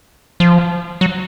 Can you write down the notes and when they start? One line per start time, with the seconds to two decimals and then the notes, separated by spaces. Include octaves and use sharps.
0.40 F3
1.01 F#3